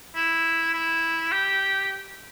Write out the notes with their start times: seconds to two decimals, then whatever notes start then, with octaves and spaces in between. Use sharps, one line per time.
0.15 E4
0.73 E4
1.32 G4